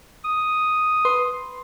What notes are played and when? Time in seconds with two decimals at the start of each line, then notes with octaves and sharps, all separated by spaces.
0.24 D#6
1.05 B4 C6